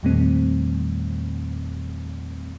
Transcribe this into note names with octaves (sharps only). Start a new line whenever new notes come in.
E2 A#2 D#3 G3 A3 C4